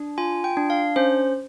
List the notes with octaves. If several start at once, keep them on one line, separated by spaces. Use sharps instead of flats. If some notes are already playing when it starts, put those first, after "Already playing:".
Already playing: D4
F4 G#5
G5
D4
F5
C#4 C5